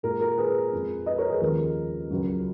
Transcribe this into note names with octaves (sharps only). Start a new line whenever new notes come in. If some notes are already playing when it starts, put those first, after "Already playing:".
A#2 G#3 A#4
A#4
G#4 B4
F2 F3 G#3
B4 D#5
A#4 C#5
G#4 B4
D#2 C#3 F3 G#3 A#4
C#2 C#3 F#3